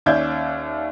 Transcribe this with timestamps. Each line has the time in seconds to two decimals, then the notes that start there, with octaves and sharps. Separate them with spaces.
0.06 D#2 C#4 D5 E5 G6 G#6